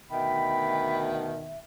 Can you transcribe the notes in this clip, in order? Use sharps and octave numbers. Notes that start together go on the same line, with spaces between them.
D2 B2 D#3 E5 G5 B5